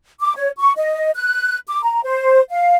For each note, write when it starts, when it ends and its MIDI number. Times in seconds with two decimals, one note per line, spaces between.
0.21 0.33 86
0.36 0.50 73
0.59 0.72 85
0.77 1.10 75
1.15 1.58 90
1.67 1.81 86
1.83 2.01 82
2.04 2.40 72
2.50 2.76 77